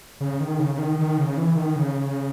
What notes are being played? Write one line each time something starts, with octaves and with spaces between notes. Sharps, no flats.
C#3
D#3
C#3
D#3
D#3
C#3
E3
D#3
C#3